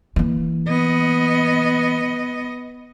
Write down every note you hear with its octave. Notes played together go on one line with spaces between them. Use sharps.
E3 A#3
B3 D#5